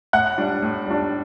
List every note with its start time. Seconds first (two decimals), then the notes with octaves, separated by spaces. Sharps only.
0.13 A2 F#5 F#6
0.38 G3 D4
0.62 A2
0.86 G3 D4